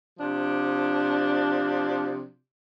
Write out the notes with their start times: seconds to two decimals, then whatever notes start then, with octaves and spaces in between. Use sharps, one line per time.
0.19 C3 F3 D4